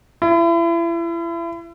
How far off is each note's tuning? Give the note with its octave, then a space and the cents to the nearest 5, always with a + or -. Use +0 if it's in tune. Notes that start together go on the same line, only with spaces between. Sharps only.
E4 +35